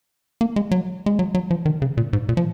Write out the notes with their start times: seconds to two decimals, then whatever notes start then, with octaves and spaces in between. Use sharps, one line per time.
0.41 A#3
0.56 G#3
0.71 F#3
1.06 G#3
1.19 F#3
1.35 F#3
1.51 F3
1.66 D#3
1.82 C#3
1.97 A#2
2.13 G#2
2.29 A#2
2.37 F3